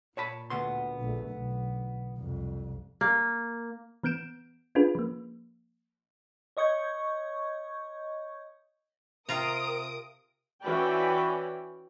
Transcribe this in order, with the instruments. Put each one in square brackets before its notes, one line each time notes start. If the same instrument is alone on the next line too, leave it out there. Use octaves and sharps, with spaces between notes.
[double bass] A#2 [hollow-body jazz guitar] C#5 A5 B5
[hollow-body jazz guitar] D2 B3 C6
[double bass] A#1 A3
B1
C2 F2
[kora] A#3
[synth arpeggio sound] E3 B3 G6 D7 E7
C#4 D4 F4 G#4 B4
F3 A#3
[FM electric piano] C#5 D#5 C#6 G6 G#6
[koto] C3 F4 A#5 [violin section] A#4 D#6 D7
[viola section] E3 C#4 F#4 B4 D5 G5